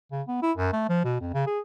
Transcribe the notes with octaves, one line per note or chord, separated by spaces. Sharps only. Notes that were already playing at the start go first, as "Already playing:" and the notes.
C#3
B3
E4
F#2
A3
F3
B2
F2
C#3
G#4